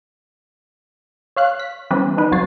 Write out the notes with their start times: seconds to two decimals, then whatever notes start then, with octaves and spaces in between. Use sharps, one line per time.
1.37 C#5 F5 F#6
1.60 B6
1.90 E3 G3 B3 C#4 B4 C5
2.17 D#3 D#4 B4
2.31 C2 F#3 C4 C#5 A6 C7